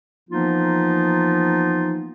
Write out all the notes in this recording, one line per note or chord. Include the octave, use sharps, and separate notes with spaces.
E3 F3 A#3 B3 D#4 F4